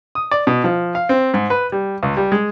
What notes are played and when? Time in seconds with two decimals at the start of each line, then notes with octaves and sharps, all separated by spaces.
0.15 D#6
0.31 D5
0.47 B2
0.64 F3
0.95 F5
1.09 C4
1.34 G#2
1.50 B4
1.72 G3
2.03 C#2
2.17 G3
2.32 G#3